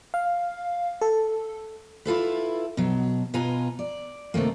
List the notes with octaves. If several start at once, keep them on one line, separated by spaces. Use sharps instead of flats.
F5
A4
E4 F4 A4 B4
B2 F#3
B2 F4 B4 G#5 A#5
D5
C3 D#3 A3 A#3